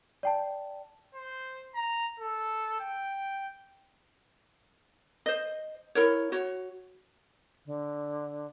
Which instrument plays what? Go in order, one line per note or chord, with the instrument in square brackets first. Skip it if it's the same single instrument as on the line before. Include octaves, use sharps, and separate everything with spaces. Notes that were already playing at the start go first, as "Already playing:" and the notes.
[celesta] D5 G5 A5
[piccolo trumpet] C5
A#5
A4
G5
[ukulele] C5 D#5
E4 A#4 C#5
F#4 C#5
[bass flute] D3